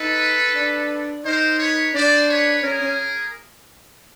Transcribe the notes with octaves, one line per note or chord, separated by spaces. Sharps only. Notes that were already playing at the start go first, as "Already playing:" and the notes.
Already playing: D#4 A4 B4
D4
D#4 A#4 C5
B4 C#5
D4 C5 D5
B4 C#5
C#4 G#4 A#4
C#4